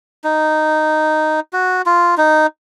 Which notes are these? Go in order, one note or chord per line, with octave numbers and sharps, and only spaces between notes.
D#4
F#4
F4
D#4